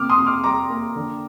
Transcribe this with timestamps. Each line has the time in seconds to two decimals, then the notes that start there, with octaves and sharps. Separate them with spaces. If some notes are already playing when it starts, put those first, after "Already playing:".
Already playing: C3 A#3 D6 F6
0.09 C6 D#6
0.17 C3
0.26 D6 F6
0.44 G3 A#5 D6
0.70 A#3
0.96 D3